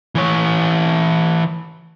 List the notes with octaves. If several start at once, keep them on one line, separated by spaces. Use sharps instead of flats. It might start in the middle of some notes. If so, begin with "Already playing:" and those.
E3 C#5